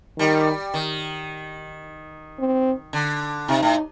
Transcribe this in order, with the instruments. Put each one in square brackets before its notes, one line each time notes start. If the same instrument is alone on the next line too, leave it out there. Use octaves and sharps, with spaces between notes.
[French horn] D#3 [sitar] G3
[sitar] D#3
[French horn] C4
[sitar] D3
[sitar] C3 [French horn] D#4
[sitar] A2